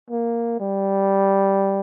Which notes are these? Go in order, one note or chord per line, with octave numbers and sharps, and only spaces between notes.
A#3
G3